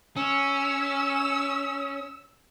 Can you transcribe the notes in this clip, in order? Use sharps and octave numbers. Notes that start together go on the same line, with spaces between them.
C#4 E6